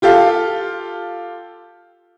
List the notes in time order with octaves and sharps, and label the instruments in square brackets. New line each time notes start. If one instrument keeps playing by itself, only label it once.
[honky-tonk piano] F4 G4 A4 F5